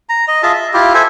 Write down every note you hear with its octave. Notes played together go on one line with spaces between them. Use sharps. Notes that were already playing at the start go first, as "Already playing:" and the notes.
A#5
D#5
F4 G#4 E5 A5
E5
E4 F4 G4
A4 C5 E5 G#5